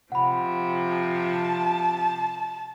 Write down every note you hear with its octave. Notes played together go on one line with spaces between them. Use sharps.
C3 F3 F#5 B5
A5